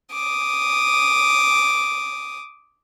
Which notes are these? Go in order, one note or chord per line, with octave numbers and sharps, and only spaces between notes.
D6 D#6